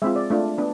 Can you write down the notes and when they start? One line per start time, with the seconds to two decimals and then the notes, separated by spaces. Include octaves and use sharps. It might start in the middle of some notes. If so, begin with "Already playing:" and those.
0.02 G#3 C4 F4 E5
0.16 D5
0.30 A3 D4 F4
0.58 B3 D4